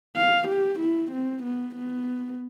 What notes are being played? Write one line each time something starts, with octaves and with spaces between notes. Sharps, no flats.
F5
G4
E4
C4
B3
B3